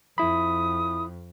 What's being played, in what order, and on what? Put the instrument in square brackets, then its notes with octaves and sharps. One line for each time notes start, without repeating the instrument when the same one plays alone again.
[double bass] F2 [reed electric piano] E4 B5 [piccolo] D#6